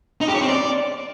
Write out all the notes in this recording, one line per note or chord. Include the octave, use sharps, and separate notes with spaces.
D#4
G4
C#5
C4
D5